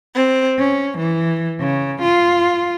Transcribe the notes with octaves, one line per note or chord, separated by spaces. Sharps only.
C4
C#4
E3
C#3
F4